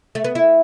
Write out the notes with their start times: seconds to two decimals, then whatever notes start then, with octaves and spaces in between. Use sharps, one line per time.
0.15 A3
0.24 B3
0.35 E4